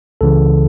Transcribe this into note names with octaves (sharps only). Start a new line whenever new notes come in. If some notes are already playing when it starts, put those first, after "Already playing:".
C#2 C#3 E3 A4